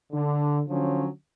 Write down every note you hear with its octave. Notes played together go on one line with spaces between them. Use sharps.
D3
D3 F3 F#3 C#4